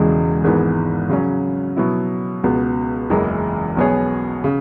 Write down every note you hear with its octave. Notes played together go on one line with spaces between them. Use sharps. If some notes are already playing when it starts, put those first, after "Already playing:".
Already playing: E1 E2 C#3 E3 G#3
G#1 G#2 E3 B3
C#3 F#3 C#4
B2 F#3 B3 E4
C#2 B2 B3
F#1 E2 E3 G#3 E4
B1 B2 B3 G#4 C#5
C#3